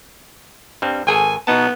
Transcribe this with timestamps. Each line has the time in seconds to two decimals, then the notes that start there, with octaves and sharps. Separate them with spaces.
0.82 G2 G3 C4
1.07 G#1 G#4 A4 G#5
1.47 B2 B3 D#4 A5